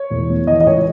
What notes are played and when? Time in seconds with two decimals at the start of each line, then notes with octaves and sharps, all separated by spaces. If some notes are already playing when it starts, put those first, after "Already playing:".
Already playing: C#5
0.10 E1
0.29 E2
0.47 E3 D#5
0.60 D#5
0.66 C#2 C#5